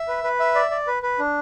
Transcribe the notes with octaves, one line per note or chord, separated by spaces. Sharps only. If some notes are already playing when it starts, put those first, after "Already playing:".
Already playing: E5
B4
B4
E5
D5
D5
B4
B4
D4